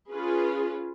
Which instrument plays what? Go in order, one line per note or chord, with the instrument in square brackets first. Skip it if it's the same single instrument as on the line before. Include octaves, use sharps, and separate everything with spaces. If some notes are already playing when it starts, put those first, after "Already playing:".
[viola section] C#4 F4 G#4 B4